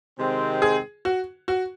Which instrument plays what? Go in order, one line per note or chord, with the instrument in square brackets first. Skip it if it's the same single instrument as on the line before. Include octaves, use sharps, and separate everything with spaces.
[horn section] C3 D#3 G#3 C4
[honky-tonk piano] G#4
F#4
F#4